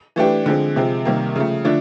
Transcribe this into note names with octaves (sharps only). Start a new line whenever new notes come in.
E3 A3 D4 G4
D3 F3 G#3 C4
C3 F3 G#3 C4
C3 D#3 G3 A#3
C#3 F3 A3
D3 F3 A3 D4